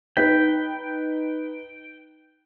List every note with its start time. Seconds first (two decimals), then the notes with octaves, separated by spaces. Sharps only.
0.17 D#4 B4 G5 B6